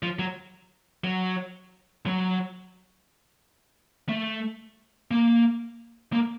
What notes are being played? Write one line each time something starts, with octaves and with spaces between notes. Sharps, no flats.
F3
F#3
F#3
F#3
A3
A#3
A#3